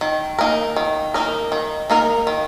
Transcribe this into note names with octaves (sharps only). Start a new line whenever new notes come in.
D#3
A#3 D#4 A#4
D#3
A#3 D#4 A#4
D#3
A#3 D#4 A#4
D#3